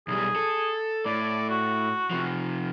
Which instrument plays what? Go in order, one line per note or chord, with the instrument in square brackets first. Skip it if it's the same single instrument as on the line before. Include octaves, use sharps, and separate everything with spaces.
[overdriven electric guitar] B1 G3 [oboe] G#4
[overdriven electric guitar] A4
[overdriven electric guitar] A2 [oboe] D5
[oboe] F#4
[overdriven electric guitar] C3 F3